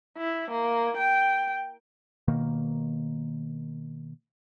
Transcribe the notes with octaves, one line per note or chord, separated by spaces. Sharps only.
E4
A#3
G5
B2 D#3 A#3